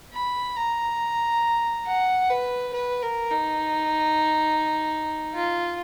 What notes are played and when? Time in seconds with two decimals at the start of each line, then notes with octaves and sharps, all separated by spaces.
0.13 B5
0.56 A#5
1.87 F#5
2.30 B4
2.73 B4
3.02 A#4
3.31 D#4
5.34 F4